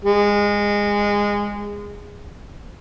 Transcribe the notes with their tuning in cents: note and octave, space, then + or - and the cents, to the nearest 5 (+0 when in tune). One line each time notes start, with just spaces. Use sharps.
G#3 -20